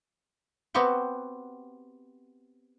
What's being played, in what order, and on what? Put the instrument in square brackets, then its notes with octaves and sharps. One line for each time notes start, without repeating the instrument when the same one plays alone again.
[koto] B3 C4 F#4 G4 G5